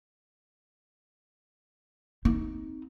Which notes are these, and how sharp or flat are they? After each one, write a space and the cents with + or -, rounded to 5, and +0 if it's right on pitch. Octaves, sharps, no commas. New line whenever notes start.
C4 +0 D#4 +15